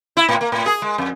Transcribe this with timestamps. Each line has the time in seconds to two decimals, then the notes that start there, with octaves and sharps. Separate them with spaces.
0.17 E4
0.29 A2
0.41 A#3
0.52 A2
0.66 G#4
0.82 G#3
0.98 F2